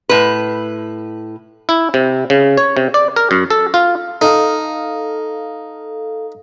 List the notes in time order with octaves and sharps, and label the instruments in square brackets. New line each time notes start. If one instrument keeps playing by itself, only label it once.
[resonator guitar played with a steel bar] A2 B4
[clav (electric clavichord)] E4
C3
C#3
C#5
C3
D5
A#4
F#2
A4
F4
[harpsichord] D#4 [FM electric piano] A4 F5